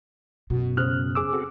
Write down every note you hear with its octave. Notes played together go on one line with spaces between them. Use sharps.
F#2 B2 F#4
C#3 C5 D#6 F6 F#6
G#4 D6 E6
C4 F#4 A4